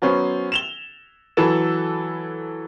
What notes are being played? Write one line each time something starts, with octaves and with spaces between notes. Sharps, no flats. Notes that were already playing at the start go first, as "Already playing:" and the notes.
F#3 B3 C#4 C5
E7 F7 G7
E3 F#3 A4 B4 E7